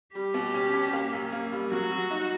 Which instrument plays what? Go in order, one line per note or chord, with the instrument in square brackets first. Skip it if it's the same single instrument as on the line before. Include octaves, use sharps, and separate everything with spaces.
[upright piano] G3 [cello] G4
[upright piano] B2
C#4
C#4
A#3
F#2
A#3
G3
[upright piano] F#3 [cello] F#4
[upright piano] F#3
D#4